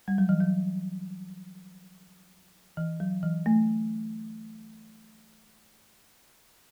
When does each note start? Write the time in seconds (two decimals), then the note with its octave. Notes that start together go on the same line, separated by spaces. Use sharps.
0.08 G3
0.18 F#3
0.29 E3
0.41 F#3
2.77 E3
3.00 F#3
3.23 E3
3.46 A3